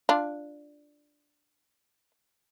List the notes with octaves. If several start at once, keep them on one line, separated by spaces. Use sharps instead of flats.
D4 F4